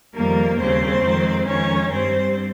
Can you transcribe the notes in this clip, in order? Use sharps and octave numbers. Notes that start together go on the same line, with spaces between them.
F2 D#3 G3 A#3 A#4
D#2 C#3 G3 C4 C5
F2 D#3 G#3
F2 D#3 G#3 C#4 C#5
G2 G3 C4 C5